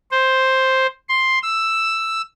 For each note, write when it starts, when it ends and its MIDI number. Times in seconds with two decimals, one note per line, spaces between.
0.11 0.87 72
1.09 1.38 84
1.43 2.22 88